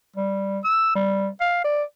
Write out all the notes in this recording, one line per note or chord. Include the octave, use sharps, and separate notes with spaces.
G3
E6
G3
F5
D5